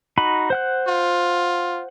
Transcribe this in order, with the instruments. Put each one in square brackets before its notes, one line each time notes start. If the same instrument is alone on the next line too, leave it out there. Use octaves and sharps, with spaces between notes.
[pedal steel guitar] D#4 F#4 B5
C5 F#5 F#6
[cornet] F4